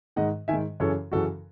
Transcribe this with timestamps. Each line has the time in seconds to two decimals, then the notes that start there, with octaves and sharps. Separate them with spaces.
0.16 G#2 D#3 D#5 F#5
0.48 D#3 E5 G#5
0.53 G#2
0.80 F#2 C#3 E3 A4 C#5
1.12 F#2 C#3 E3 F#4 A4